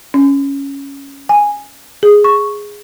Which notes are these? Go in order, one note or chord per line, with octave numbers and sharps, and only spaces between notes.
C#4
G#5
G#4
C#6